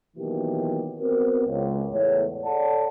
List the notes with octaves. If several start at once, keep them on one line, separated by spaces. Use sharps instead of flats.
B2 D#3 E3 F#3 A#3 G4
B3 C4 F#4 A#4
C#2
E2 A2 C#5
A4 C#5 D5 F#5 A5